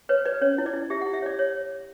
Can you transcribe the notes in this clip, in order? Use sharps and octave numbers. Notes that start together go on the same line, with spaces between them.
B4 C#5
B4 D5
C#4 C#5
E4
D5
E4
G4 E5
F#5
E4
E5
C#5 D5
C#5